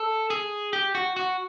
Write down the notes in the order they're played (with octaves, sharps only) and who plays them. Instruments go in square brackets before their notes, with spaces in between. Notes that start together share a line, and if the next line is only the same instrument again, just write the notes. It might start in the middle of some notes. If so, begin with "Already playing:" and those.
Already playing: [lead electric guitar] A4
G#4
G4
F#4
F#4